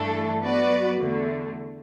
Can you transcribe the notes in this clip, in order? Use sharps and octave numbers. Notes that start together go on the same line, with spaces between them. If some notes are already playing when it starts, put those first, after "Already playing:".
Already playing: G2 E3 A3 D4 A4
F#3 B3 F#4 B4 D5
E2 D3 A3